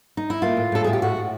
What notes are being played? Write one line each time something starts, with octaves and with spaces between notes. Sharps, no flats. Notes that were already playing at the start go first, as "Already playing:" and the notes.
D#4
E4
A#3 F4
A2
A2 A4
A2 G#4
G4
A2 F#4
A2